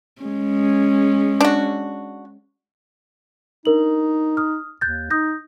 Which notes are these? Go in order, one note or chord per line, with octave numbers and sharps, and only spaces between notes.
G#3 C#4
D4 F#4
D4 D#4 A#4 F#7
D#6 F6
D#2 F#6 G6 A6
D#4 D#6 G6 A#6